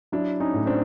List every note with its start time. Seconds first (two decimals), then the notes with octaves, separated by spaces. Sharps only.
0.12 F#3 D4 E4
0.40 C#4 D#4
0.54 A2
0.66 C4 D4